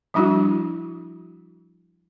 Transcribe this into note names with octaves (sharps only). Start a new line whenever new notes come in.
F3 G3 D4 E4 F#4